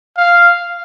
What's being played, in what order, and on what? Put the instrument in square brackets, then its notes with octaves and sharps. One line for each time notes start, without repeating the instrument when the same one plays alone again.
[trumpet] F5